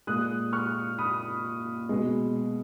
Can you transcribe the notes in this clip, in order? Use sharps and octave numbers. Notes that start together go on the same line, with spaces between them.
A#2 G#3 D#6 F#6
C#6 F6
B5 D#6
B2 G#3